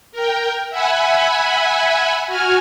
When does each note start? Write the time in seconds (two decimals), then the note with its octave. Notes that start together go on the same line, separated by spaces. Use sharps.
0.12 A#4 G5
0.70 E5 F#5 G#5 B5
2.27 F#4 G#5 F6